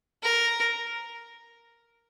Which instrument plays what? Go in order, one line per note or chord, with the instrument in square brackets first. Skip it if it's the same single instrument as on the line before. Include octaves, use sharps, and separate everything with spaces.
[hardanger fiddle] A#4